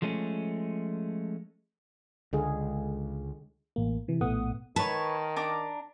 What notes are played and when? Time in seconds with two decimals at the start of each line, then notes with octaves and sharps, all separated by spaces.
0.02 F3 G#3 A3 C#4
2.33 C#2 D3 G#3 G#4
3.76 A1 A#3
4.08 C3 E3
4.21 A#1 A2 A3 B3 F#5 D#6
4.76 D#3 B4 C#5 A5
5.36 D4 A#5 D6